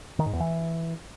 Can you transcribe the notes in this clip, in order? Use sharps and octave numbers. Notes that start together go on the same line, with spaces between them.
D#3
G#2
E2
E3